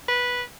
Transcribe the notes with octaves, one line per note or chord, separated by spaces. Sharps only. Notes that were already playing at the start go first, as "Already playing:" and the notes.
B4